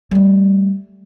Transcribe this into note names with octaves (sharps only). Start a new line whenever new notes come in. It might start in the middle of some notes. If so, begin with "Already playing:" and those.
G3 A3